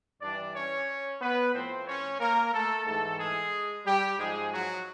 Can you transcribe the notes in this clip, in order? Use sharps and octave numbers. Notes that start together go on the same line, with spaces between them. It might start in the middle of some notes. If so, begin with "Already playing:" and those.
G2 E3 D4 D5
C#4 C#5
B3 B4
A2 F3 C4 C5
C#4 C#5
A#3 A#4
A3 A4
G#2 E3 A3 A4
G#3 G#4
G3 G4
G#2 F3 G#3 G#4
F#3 F#4